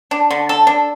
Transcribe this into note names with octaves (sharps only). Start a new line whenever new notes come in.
D4
D3
A4
D4